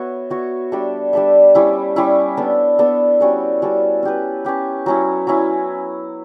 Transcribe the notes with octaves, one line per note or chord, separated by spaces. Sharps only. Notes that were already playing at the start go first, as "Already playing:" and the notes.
Already playing: B3 F#4 C#5 E5
B3 F#4 C#5 E5
G3 D4 A4 E5
G3 D4 A4 E5
G3 C#4 E4
G3 C#4 E4
B3 D4 A4
B3 D4 A4
G3 C#4 F#4 A4
G3 C#4 F#4 A4
C#4 G4 B4
C#4 G4 B4
F#3 C#4 E4
F#3 C#4 E4